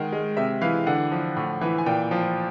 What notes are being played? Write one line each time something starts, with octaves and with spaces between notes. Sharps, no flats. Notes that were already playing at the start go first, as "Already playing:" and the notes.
Already playing: D#3 G#3 F#5
G#3
C3 E5
E3 F5
D3 F#5
F3
A2
E3
G#5
A#2 G5
F3